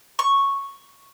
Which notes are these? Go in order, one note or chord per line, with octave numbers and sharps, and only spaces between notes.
C#6